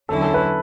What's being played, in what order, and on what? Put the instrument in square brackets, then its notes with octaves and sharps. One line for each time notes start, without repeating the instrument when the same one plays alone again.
[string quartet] E2 D3 F#3 C#4 E4 [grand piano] A4
[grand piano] A4
B4